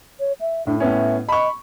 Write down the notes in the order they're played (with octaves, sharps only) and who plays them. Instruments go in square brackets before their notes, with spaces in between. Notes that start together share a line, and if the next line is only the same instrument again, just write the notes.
[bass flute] C#5
E5
[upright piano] A2 [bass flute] D4
[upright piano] A2 B3 C#4 [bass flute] E5
[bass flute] D#5 [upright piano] B5 C#6